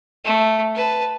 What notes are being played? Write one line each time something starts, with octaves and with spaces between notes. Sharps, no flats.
A3
B4 A5